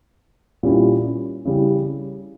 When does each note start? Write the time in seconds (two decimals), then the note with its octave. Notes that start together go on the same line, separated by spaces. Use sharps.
0.63 A#2 G3 C#4 E4
1.45 C#3 G3 C#4 E4